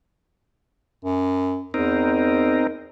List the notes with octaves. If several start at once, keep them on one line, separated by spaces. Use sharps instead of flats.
F#2
E2 C4 D#4 A#4